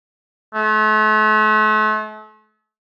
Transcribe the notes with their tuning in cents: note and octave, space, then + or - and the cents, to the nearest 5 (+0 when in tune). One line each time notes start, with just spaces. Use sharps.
A3 -40